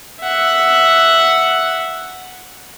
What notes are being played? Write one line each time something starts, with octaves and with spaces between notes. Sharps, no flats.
E5 F#5